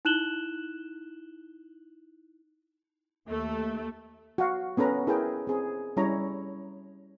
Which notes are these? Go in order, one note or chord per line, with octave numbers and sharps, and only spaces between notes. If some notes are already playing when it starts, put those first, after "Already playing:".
D#4 E4 F#6 E7 F#7 G7
D#2 A3
F#4 F5
B3 C#4 A4 B4 A#5
E4 G#4 A#4 B4 G5
C4 G#4
G3 C#4 E4 C#5 A#5